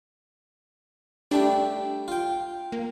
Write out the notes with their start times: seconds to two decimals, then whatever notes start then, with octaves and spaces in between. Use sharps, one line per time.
1.31 G3 A3 D4 G4
2.08 F4 G5
2.72 A#3